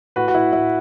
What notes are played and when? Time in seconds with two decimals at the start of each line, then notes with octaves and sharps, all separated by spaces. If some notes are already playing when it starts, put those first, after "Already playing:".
0.16 A2 F#4 B4
0.28 F#4
0.35 E4
0.52 A2 E4